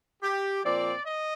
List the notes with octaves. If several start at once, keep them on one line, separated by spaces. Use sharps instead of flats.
G4
A#2 F3 C4 D5
D#5